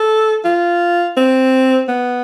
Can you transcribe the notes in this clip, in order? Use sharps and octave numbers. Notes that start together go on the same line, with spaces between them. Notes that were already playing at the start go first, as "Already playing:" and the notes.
Already playing: A4
F4
C4
B3